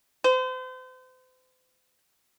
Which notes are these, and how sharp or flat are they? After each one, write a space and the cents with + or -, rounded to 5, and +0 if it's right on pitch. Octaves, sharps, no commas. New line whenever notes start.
C5 -40